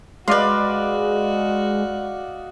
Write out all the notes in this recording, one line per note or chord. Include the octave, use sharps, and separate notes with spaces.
G#3 F#4 B4 D5 D#5 F5 C6